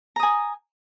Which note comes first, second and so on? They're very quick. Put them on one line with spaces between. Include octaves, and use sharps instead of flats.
A#5 D#6 G#5